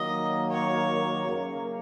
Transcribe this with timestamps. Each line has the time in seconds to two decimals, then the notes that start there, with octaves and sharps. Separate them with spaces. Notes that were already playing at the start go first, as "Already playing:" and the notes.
Already playing: D#3 F#3 A#3 D#5
0.50 C#5
1.26 F#2 C#3 A#3